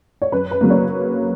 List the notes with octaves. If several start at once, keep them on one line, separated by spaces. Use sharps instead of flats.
C#5
F#2 B4
B4
C#3 F#3 A#3
C#5